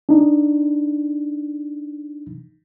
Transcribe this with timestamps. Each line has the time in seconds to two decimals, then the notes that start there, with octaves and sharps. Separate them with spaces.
0.09 D4 D#4